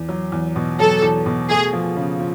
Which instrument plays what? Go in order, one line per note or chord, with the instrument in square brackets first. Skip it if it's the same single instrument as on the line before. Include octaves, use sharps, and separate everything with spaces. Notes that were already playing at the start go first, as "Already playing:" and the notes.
Already playing: [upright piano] E2
F#3
E2
B2
[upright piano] F#3 [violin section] A4
[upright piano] E2
B2
[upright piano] A3 [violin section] G#4
[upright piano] F3
C#3
F3